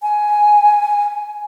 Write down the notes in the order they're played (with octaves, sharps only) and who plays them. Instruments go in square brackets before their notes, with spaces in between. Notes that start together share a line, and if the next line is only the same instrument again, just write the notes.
[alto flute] G#5